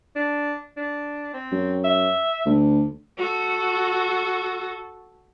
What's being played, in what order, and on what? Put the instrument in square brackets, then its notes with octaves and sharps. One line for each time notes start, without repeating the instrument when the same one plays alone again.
[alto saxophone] D4
D4
C4
[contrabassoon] F#2
[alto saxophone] E5
[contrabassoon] D2
[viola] F#4 A4